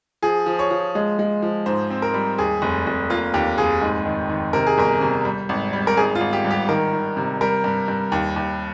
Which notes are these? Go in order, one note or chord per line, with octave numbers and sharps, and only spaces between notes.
F3 G#4
F3
C#5
F3
G#3
G#3
F3
G#2 C5
C4
A#4
G3
D#2 G#4
F1
F1
A#3 F4
D#2 G4
F1 G#4
G#2
D#3
D#3
C3 A#4
G#4
G1 A#4
C3
G3
G#1
G3
A#4
G#1 G#4
F4
G#1
G4
G2
G4
D#3 A#4
D#3
C3
G3 A#4
G2
G2
D#2
D#2